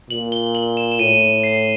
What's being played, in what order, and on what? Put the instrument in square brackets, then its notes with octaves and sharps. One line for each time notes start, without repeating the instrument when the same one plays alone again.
[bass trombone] A#2 [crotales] F#7
[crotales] G7
F#7
E7
E7
[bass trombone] A2 [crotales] D#7
[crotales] C7